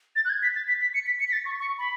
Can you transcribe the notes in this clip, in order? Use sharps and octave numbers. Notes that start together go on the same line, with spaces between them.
A6
F#6
G#6
B6
A6
B6
B6
C#7
B6
C#7
B6
A6
C#6
C#6
B5